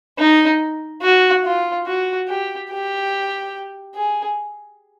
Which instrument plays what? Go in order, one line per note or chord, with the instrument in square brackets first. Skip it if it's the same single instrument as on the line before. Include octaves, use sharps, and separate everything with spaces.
[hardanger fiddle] D#4
F#4
F4
F#4
G4
G4
G#4